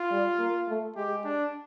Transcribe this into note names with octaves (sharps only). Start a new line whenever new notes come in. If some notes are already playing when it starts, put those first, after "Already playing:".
Already playing: F4
G3
A#3
A3
G#3 G4
D4